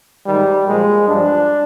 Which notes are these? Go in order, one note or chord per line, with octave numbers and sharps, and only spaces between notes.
G#2 D#3 G3
A#2 F3 G#3
G2 F3 D4